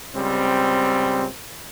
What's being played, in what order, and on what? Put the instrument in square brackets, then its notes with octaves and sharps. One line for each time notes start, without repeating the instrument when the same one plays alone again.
[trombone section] C#2 G3 C4